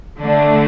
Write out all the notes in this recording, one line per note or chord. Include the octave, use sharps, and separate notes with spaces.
D3 A3 D4